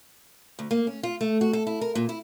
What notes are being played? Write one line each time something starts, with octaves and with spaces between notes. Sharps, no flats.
D2
A#3
C#4
F4
A3
F#4
A4
E4
A#4
A#2
E4